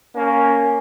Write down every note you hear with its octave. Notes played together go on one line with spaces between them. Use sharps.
A#3 C#4